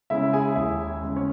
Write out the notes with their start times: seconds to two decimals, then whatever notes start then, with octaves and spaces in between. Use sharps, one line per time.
0.10 C#3 G#3 C#4 E4 E5
0.33 G#4 G#5
0.56 D#2 E4 E5
1.02 C#3 G#3 C#4
1.16 C#4 C#5